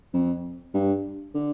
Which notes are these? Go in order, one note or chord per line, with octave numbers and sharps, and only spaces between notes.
F2
G2
D3